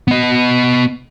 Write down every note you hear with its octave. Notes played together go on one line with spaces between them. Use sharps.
B3 D#5